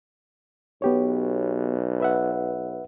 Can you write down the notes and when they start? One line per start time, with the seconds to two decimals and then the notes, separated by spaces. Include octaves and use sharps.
0.82 B1 B3 G4 C#5
2.00 B4 E5 F#5